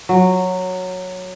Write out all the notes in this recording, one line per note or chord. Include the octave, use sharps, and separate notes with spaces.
F#3